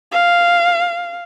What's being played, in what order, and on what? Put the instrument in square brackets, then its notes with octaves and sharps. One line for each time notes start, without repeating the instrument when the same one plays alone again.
[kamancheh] F5